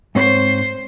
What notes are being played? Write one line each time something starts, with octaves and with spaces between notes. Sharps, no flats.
G#2 C4 C5 C#5